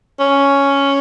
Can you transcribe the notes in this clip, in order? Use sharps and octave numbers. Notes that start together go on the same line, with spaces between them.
C#4